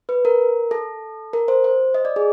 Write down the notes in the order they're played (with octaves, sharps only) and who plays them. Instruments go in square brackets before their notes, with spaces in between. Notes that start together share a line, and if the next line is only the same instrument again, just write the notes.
[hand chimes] B4
A#4
A4
A#4
C5
C5
D#5
D5
G#4